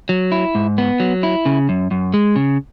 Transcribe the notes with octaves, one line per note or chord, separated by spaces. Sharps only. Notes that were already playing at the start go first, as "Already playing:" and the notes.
F#3
E4
G#2
B3
F#3
E4
C#3
F#2
F#2
G#3
C#3